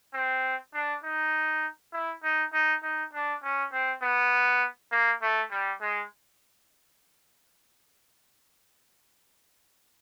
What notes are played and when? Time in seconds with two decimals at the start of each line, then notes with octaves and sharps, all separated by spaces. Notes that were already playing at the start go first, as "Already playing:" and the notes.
0.14 C4
0.74 D4
1.04 D#4
1.93 E4
2.23 D#4
2.53 D#4
2.83 D#4
3.13 D4
3.43 C#4
3.73 C4
4.02 B3
4.92 A#3
5.22 A3
5.51 G3
5.81 G#3